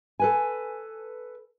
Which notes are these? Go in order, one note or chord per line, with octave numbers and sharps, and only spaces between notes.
A4 B4 G#5